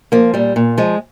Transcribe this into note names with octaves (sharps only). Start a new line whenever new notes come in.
F3 A#3
A#2 G3
A#2
F3 G#3